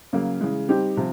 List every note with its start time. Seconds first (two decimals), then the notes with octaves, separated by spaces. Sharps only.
0.13 C#3 F#3 A#3
0.41 C#3 E3 G#3
0.69 G3 C4 D#4 G4
0.97 C3 F3